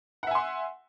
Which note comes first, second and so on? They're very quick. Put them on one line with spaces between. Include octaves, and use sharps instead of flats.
F#5 E5 G#5 C6